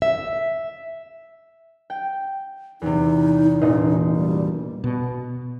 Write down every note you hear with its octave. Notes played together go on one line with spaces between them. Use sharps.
E5
G5
E2 C3 D#4
E1 A#2 D#5
G3
B2